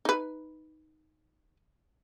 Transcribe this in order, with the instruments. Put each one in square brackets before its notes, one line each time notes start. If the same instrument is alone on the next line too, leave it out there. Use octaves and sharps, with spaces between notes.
[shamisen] D#4 B4